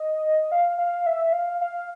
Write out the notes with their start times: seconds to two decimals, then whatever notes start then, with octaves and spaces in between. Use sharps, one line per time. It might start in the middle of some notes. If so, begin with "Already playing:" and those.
Already playing: D#5
0.52 F5
0.78 F5
1.06 E5
1.33 F5
1.61 F5